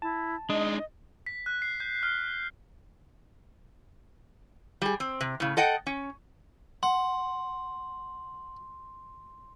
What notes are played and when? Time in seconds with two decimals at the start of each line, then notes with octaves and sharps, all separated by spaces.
0.02 E4 A5
0.50 G#3 D4 D#4 D#5
1.26 B6
1.46 F#6
1.62 C7
1.80 G6
2.03 F6
4.82 G3 G#4
5.00 C4
5.21 C3
5.40 A2 C#3
5.57 A4 D#5 F#5 G5
5.86 C#4
6.83 F#5 C6